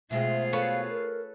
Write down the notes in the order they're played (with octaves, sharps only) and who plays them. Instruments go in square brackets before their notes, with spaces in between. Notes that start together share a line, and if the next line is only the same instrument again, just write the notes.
[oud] B2 G#3 C4 [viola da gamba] A3 F4 G#4 [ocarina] E5
[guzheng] A4 B4 C#5 [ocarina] F5
[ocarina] A#4